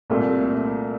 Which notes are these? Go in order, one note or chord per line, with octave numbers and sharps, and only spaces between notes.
C2 A#2 A3